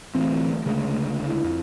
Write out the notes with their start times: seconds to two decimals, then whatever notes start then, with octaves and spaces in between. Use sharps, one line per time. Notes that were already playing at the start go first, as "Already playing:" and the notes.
0.15 D1 E3 A3 C4
0.65 D2 C#3 G#3
1.24 E4
1.44 F2